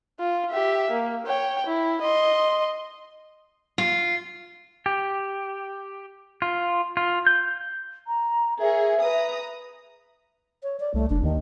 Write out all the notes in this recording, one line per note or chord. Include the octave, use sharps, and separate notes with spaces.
F4
G4 E5
A#3
C#5 G5
E4
D#5 C6
F4
G4
F4
F4
G6
A#5
G#4 A#4 C#5 E5
B4 A#5 D#6
C#5
D5
C2 A3
F#1 D4
D#2 D#3